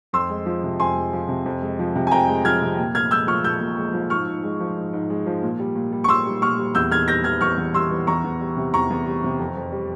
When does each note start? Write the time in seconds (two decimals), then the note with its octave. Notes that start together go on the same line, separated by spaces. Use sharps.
0.13 F2 C6 E6
0.30 G#3
0.46 F3
0.64 C3
0.80 F2 G#5 C6
0.96 G#3
1.13 F3
1.29 C3
1.46 F2
1.62 G#3
1.79 F3
1.96 C3
2.07 G#5
2.11 F2 G5 A#5
2.29 G#3
2.45 F3 F6 G#6
2.62 C3
2.78 A#2
2.95 A#2 F6 G#6
3.11 G#3 E6 G6
3.27 F3 C#6 F6
3.44 A#2 E6 G6
3.61 A#2
3.78 G#3
3.94 F3
4.10 G#2 C#6 F6
4.27 G#2
4.43 G#3
4.60 F3
4.76 G#2
4.93 G#2
5.10 G#3
5.27 F3
5.43 A#2
5.60 G3
5.76 A#2
5.93 G3
6.04 C#6
6.08 A#2 C6 E6
6.26 G3
6.42 A#2 C#6 F6
6.58 G3
6.75 E2 E6 G6
6.91 E2 F6 G#6
7.08 G3 G6 A#6
7.24 E3 F6 G#6
7.41 E2 C#6 F6
7.58 E2
7.74 G3 C6 E6
7.91 E3
8.07 E2 A#5 C#6
8.24 E2
8.41 G3
8.57 C3
8.74 E2 A#5 C#6
8.90 E2
9.07 G3
9.24 C3
9.39 F2
9.57 F2
9.72 G3